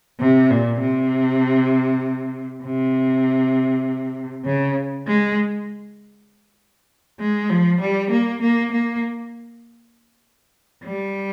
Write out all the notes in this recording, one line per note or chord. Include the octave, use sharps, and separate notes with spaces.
C3
A#2
C3
C3
C#3
G#3
G#3
F3
G3
A#3
A#3
A#3
G3